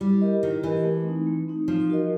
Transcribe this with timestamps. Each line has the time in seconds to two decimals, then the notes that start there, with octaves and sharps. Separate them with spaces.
0.01 G3 E4
0.21 G4 A#4 D#5
0.43 D#3 E4
0.63 E3 G4 A#4 D#5
0.84 A3
1.05 C4 D#4
1.27 A3
1.48 C4 D#4
1.68 F3 D#4
1.90 F#4 A#4 D#5